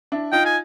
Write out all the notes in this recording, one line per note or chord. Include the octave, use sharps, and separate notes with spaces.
D4 E4
D#4 F4 G5
G#5